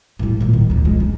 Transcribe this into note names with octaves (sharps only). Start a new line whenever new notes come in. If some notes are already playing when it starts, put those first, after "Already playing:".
A2 G3
A#2 F3
D#3
D2 G2
F3 G#3
C#4